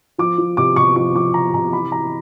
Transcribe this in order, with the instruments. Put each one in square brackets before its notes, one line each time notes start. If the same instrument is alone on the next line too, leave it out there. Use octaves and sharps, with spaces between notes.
[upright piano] F3 D6
F3
C3 D6
C3 C#6
F3 C#6
F3 D6
C3 A#5
C3 A#5
E3 B5
E3 A#5